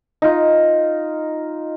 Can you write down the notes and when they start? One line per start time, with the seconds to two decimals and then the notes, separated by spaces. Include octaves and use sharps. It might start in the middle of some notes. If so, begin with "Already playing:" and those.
0.22 D#4 F4